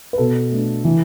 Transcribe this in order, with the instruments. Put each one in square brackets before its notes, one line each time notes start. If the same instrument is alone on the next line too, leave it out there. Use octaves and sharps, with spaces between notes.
[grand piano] B4
B2 A4
A3 D4
E3